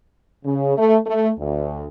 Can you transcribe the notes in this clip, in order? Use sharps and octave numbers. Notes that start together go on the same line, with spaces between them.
C#3
A3
A3
D2